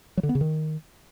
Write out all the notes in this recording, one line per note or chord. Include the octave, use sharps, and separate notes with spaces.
F#3
D3
B3
C#3
D#3